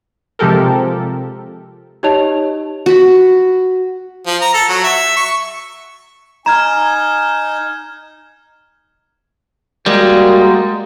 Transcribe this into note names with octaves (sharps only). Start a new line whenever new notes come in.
C3 F3 G#3 G4 A4 A#4
D#4 G4 C#5 D#5 A5 F7
F#4 B5
F3
A#5
A4
F#3
E5
C#6
D#4 G#5 A#5 F6 G#6 E7
G3 G#3 A#3 F#4 A#4